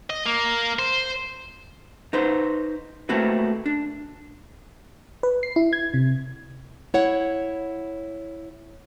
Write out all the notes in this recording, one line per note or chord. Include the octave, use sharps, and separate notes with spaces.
D#5
A#3
C5
D#4 B4 C5
A3 A#3 C4 E4 F#4 B4
D4
B4
C7
E4
G#6
C3
E4 C#5 F#5